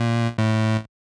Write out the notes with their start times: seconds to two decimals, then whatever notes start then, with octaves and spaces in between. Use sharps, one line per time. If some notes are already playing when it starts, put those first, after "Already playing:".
Already playing: A#2
0.38 A2